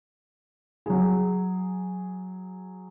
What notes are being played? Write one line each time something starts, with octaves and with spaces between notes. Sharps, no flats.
F#3 G#4